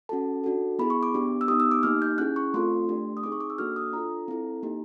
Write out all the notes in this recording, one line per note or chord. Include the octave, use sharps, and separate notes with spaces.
C#4 F#4 A4 A5
D4 F#4 A4
B3 E4 G#4 B5
C#6
D6
B3 D4 G4
E6
B3 D#4 G4 D#6
E6
D6
A#3 D#4 G4 F6
G6
C#4 E4 G#4 F#6
C#6
A3 C4 F4 A4 C6
A3 D4 G4
D#6
C4 D#4 G#4 D6
C#6
D6
E6
A#3 D4 F#4 A4 F6
D#6
D4 F4 A4 A#5
C4 E4 A4
A#3 D#4 G4